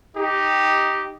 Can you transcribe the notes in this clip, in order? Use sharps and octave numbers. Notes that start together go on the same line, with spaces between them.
D#4 G4